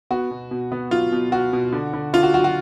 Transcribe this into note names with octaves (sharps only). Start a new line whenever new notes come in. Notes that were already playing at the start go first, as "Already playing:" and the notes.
B3 F#4
B2
B2
B3
F#3 F4
B2
B2 F#4
B2
D3
D3
D3 F4
F#4
F#3 F#4
F#4